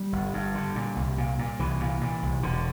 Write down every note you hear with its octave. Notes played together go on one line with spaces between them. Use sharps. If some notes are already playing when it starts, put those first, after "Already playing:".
Already playing: G3
G1
G2
D3
A#2
C2
A#2
A#2
C2 E3
A#2
A#2
C2
E1 D3